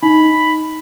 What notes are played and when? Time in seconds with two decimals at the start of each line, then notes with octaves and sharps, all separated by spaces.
0.03 D#4 B5